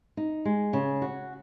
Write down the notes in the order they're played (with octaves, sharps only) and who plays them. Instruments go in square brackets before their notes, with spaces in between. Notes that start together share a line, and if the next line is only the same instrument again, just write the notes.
[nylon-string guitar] D#4
G#3
C#3
F#4